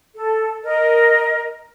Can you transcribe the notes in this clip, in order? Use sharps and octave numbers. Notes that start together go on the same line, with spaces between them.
A4
A#4 D#5